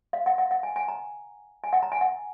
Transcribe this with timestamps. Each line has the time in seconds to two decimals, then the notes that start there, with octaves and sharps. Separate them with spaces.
0.13 F5
0.26 F#5
0.38 F#5
0.51 F#5
0.63 G#5
0.76 G#5
0.88 A#5
1.64 G#5
1.73 F#5
1.83 A#5
1.92 G#5
2.01 F#5